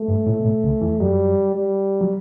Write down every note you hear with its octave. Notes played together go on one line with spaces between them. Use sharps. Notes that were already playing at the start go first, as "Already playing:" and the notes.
Already playing: A3
G2
A2
B2
A2
C#2 C#3
E2 E3
F#2 F#3 G3
G3
F#3